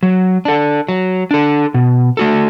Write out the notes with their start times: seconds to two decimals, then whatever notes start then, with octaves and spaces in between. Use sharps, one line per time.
0.03 F#3
0.45 D4 A4
0.88 F#3
1.31 D4 A4
1.74 B2
2.17 A3 F#4 A4